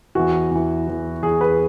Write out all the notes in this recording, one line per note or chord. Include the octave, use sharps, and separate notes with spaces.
E2 E3 F#4
E2 E3
E2 E3
E2 E3 G#4
B4